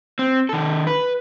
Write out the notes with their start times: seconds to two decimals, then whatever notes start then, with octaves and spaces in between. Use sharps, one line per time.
0.19 C4
0.49 D#3 A4
0.87 B4